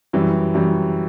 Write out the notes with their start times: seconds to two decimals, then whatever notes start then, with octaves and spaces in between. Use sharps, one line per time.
0.13 F#2 E3 G3
0.54 F#2 E3 G3